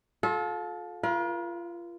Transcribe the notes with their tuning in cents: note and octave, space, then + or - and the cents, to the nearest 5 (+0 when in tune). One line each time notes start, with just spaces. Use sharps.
F4 +30 A4 -30
F4 -25 A#4 +45